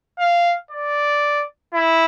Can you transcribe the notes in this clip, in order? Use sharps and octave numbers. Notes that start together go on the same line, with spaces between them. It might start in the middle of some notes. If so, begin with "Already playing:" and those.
F5
D5
E4